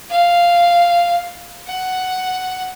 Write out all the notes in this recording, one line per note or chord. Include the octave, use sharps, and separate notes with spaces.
F5
F#5